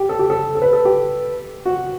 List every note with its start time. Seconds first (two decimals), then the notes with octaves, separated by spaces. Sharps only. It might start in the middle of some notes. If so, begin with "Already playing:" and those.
Already playing: G4
0.09 A4
0.19 G4
0.30 A4
0.55 A4
0.62 B4
0.73 A4
0.85 G4
1.65 F#4